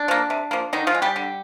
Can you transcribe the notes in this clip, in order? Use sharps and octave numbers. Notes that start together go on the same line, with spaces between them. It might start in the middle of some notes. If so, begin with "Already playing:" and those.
Already playing: D4
F3 A#3
C3
F3 A#3
D3 D#3 D#4
F3 F4
G#3
G3 G4
D3